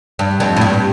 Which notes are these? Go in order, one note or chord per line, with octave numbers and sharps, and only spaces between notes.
G2
F2
A2
G2